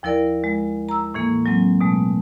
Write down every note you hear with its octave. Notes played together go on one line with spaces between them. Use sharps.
D#2 F3 E4 A#4 D5
G#3
A#5 E6
A2 E3 A#3
F#3 G#3 C4
B2 G#3 A3